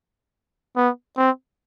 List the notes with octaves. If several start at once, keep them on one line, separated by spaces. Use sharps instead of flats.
B3
C4